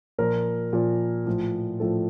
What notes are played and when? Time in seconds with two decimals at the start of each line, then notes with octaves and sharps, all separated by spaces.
0.18 A#2 F3 A#4
0.73 A#2 F3
1.26 A2 F3
1.80 A2 F3 A4